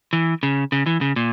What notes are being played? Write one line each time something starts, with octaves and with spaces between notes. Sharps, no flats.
E3
C#3
C#3
E3
C#3
A#2